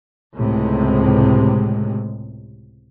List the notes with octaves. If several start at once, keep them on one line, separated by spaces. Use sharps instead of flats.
C#2 A2 C3 G#3